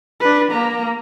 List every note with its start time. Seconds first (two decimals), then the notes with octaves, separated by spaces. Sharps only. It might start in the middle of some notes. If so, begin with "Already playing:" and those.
0.20 D4 B4
0.51 A#3 A#5